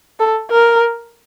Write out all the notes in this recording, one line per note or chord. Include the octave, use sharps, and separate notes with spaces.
A4
A#4